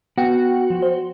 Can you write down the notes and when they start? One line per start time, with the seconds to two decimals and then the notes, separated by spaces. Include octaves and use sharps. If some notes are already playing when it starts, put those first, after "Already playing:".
0.18 B3 F#4 F#5 G5
0.70 F3
0.82 C5